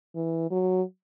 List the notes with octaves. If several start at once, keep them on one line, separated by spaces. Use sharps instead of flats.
E3
F#3